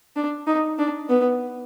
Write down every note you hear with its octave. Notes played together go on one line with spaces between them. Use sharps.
D4
D#4
D4
B3